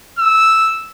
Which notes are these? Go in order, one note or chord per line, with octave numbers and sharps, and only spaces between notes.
E6